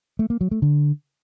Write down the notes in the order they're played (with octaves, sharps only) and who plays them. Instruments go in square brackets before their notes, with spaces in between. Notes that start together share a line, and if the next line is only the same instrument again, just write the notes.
[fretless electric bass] A3
A#3
F#3
A3
D3